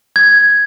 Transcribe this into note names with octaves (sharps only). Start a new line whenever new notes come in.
G#6